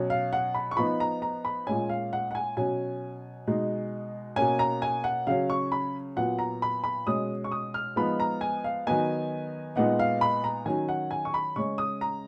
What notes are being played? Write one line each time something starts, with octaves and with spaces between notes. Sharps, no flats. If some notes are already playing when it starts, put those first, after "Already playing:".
Already playing: B2 F#3 C#4
F5
F#5
B5
C#6
F3 B3 D#4 B5
A#5
A#5
B5
A#2 G#3 C#4 G#5
F5
F#5
F#5
G#5
B2 F#3 C#4 G#5
B2 G#3 D#4
B2 A#3 C#4 G#5
A#5
G#5
F#5
C#3 F#3 C#4 F5
C#6
B5
A#2 F#3 B3 F#5
A#5
B5
B5
B2 G#3 C#4 D#6
C#6
D#6
F6
F3 G#3 B3 D#4 B5
A#5
G#5
F5
D#3 F#3 B3 D#4 G#5
A#2 G#3 B3 D#4 F#5
F5
B5
A#5
D#3 F#3 C#4 G#5
F#5
G#5
C#6
B5
C#3 G#3 C#4 C#6
D#6
A#5